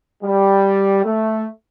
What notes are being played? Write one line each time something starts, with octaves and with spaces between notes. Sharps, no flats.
G3
A3